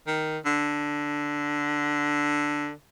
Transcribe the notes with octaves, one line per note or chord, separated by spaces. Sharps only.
D#3
D3